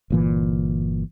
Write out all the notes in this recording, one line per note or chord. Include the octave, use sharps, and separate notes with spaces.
G1 A#2 E3